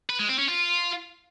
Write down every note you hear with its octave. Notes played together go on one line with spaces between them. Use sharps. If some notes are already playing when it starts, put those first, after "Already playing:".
B4
G#3
C4
C#4
F4